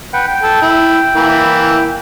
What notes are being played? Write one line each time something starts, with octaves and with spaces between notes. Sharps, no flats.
B4 F#5 G5
G5
A4
E4
E3 A#3 E4